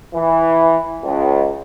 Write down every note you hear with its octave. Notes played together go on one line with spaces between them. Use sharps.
E3
C#2